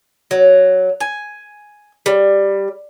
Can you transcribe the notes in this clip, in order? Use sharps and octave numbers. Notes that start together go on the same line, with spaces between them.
F#3
G#5
G3